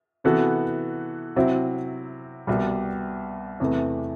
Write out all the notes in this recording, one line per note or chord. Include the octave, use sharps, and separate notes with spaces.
C3 E3 B3 F#4 A4
C3 F#3 C4 E4
C2 B2 G3
E2 C3 E3 A3